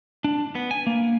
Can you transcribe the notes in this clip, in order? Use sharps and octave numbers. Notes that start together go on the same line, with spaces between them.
D4
B3
G#5
A#3